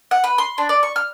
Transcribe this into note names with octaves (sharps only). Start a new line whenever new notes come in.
F#5
B4
C6
D4
D5
C#6
F6